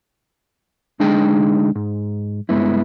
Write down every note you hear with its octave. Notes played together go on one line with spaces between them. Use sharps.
D2 G#3 D4 D#4 G#4 G5
G#2
G2 G#3 B3 E4